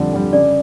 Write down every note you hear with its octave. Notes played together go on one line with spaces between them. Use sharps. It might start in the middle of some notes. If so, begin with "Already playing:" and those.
Already playing: F2 D3 G3 D5
D3 G3
C#3 D5